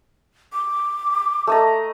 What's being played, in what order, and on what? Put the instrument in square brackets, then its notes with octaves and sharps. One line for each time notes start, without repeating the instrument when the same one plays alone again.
[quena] D6
[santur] A3 D#5 A#5